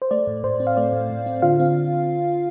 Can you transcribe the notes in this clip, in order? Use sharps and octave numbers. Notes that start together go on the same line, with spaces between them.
C5
A3 D5
A2
A2 C5
C4
F5
A3 D5
A2
A2
C4
D3 F4 F5
C4